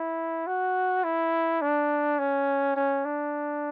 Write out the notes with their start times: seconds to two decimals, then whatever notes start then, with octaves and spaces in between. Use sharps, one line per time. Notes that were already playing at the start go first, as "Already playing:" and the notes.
Already playing: E4
0.47 F#4
1.04 E4
1.61 D4
2.19 C#4
2.77 C#4
3.05 D4